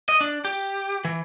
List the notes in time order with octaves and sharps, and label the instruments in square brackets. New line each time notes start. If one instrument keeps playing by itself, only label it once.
[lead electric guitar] D#5
D4
G4
E3